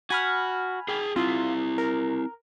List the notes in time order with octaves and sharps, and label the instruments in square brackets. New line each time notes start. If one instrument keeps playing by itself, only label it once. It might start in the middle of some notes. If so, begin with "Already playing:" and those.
[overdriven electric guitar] F#4 [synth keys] G#5 B5 F6
[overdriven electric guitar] G#4 G5
[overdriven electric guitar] C4 E4 [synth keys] F4
[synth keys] A#4